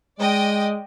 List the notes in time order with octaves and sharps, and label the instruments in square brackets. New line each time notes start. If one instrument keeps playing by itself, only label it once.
[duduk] G#3 [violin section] D5 D#5 G5